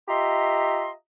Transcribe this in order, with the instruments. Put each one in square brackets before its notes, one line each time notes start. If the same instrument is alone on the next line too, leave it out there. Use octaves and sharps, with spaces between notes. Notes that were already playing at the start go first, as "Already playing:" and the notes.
[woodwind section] F4 G4 D#5 E5 A#5 C6